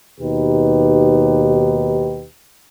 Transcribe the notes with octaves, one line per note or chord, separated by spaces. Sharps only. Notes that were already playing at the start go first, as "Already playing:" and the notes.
D#2 B2 D#4 G4 B4